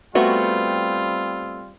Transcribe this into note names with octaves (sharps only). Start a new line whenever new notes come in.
G3 A3 B3 C4 F4 F#4